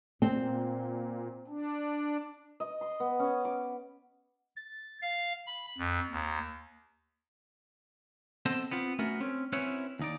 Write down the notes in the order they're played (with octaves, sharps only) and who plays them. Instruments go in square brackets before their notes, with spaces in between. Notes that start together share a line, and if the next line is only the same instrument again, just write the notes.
[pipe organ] A#2 [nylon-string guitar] C4
[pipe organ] D4
[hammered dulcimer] D#5
C6
B3
C#4
D6
[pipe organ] A6
F5
B5
F2
D#2
[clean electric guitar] B3 C4 A4 C5 D#5 A5
B3 C4 F4
A3 B3 C#4 F#4 A#4
C4 C#4
C4 C#4 E4 F#4 B4 C#5
D#2 D#4 D5